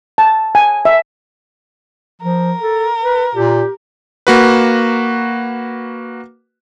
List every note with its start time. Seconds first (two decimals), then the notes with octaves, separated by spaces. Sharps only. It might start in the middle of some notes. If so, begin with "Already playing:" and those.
0.18 A5
0.55 G#5
0.85 E5
2.22 F3 A#4
2.61 A4
3.02 B4
3.35 A#2 G4
4.27 A#3 F#4 B4